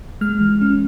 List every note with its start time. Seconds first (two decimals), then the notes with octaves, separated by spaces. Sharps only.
0.21 G#3 F6
0.41 E3
0.61 C#4